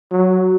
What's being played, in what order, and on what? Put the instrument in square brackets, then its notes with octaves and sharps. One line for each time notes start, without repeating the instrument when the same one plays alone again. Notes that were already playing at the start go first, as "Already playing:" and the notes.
[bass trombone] F#3